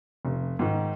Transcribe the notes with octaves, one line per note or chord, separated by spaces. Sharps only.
F1
G#2 D#3